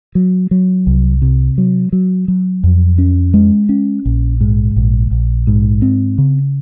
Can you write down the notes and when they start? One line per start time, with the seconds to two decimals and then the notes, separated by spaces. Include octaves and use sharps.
0.15 F#3
0.51 F#3
0.87 C2
1.22 C3
1.58 F#3
1.92 F#3
2.28 F#3
2.64 F2
2.98 C#4
3.34 G#3
3.69 C#4
4.05 A#1
4.41 G#2
4.76 A#1
5.11 A#1
5.47 G#2
5.82 C4
6.18 C#3